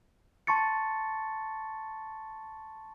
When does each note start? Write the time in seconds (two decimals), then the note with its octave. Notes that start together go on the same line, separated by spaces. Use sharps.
0.47 A5 C6 C#6 A6 C#7